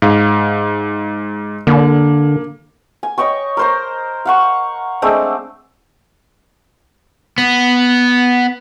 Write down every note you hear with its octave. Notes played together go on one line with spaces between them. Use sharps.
G#2 F5
D3 A#3
G#5
C#5 D#5 G5 C#6
A#4 C5 A#5
F5 F#5 C#6
G#3 A3 C4 D4
B3